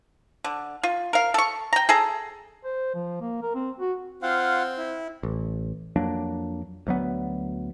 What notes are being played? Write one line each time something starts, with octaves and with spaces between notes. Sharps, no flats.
D3
F4
A#4 F5
A4 C#6
G5 A#5
G#4 A4 A#5
C5
F3
A#3
A#4
C4
F#4
C4 F4 F5 F#5
E4
A1
F2 F#3 A#3 D4
D2 F#3 B3